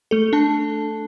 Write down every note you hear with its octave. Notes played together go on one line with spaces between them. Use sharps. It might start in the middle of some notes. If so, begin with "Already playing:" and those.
A3 A4
D4 A5